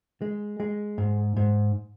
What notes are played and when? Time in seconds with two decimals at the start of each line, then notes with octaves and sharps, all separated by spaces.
0.22 G#3
0.60 G#3
0.98 G#2
1.37 G#2